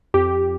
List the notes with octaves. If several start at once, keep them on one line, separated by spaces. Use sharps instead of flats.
F2 G4